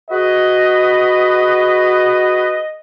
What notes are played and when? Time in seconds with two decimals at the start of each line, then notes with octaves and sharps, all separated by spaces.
0.10 F#4 G#4 B4 D#5